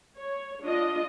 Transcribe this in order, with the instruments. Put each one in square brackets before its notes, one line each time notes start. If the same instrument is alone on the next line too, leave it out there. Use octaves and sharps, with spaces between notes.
[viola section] C#5
D4 F4 D#5